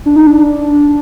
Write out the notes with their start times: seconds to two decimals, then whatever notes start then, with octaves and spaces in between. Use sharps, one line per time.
0.06 D4
0.16 D#4
0.27 D4